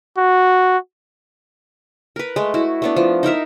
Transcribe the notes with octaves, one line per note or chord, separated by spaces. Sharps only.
F#4
A#4 B4
G#3 A3
E4 F#4
A3 B3 D4
F3
D#4 E4 A#4 E5